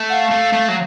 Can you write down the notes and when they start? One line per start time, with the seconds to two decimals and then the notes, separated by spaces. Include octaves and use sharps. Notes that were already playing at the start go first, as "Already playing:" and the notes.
Already playing: A3
0.09 F#5
0.12 F5
0.30 A3
0.52 A3
0.68 F#3